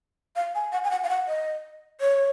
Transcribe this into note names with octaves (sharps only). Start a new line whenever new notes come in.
F5
G#5
F#5
G#5
F#5
F5
F#5
D#5
C#5